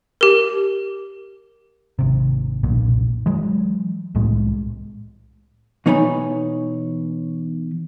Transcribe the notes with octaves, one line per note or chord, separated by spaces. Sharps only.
G4 A#4
G#1 C3
F#1 B1 A#2
E3 F#3 G#3
C2 A2 G#3
B2 E3 D#4 C#5 G#5 B5